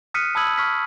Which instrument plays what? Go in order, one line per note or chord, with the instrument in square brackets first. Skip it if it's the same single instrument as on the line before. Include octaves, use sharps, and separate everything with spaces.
[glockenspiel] D#6 F6 F#6 B6 C#7 D#7
A5 B5 D#6 E6 G#6 F#7
C#6 F6 B6